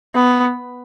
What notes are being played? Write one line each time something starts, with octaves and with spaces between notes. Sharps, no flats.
B3